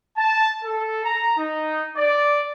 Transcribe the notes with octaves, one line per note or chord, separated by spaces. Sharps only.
A5
A4
A#5
D#4
D5